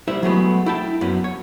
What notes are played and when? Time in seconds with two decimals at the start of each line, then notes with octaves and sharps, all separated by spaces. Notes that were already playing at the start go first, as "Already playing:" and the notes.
0.08 G3 E4 C5 E5
0.23 F#3 G#3 A3 B3
0.66 E4 G5 A5
1.01 F#2 B3 C#4
1.24 C#5